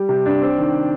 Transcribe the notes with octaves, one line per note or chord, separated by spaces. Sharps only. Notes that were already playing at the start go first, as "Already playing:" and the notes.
Already playing: G3 G4
C3
D4
C4
D#3